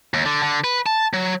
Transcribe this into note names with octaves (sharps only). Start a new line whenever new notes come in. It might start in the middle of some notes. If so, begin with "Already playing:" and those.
D#2
D3
D3
B4
A5
F#3